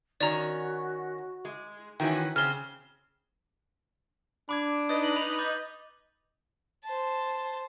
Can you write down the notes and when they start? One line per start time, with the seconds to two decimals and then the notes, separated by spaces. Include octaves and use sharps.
0.21 D#3 C#4 F#4 D5 A#5
1.45 G#3
2.00 D#3 E3 C#4 F#4 G5
2.36 C#3 C4 G#5 F6 G7
4.49 D4 B5 D6 G#6
4.89 D#4 B4 D#5 D#6 A6
5.04 F#7
5.16 B5 A#6 F7
5.39 D6 G6 A6
6.84 C5 A5